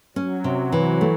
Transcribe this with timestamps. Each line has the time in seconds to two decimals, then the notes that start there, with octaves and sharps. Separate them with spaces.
0.16 F#3 C#4
0.44 C3
0.72 E3
1.01 A3